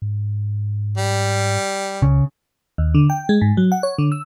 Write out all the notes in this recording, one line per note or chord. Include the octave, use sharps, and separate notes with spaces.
G#2
G3
C#2 C#3
D#2
D3
G5
G#3
G#2
F#3
F#5
C#5
D3
E6